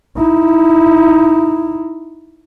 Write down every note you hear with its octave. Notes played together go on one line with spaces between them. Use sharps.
D#4 E4